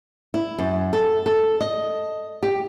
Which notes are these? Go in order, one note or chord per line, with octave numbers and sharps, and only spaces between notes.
E4
F#2
A4
A4
D#5
G4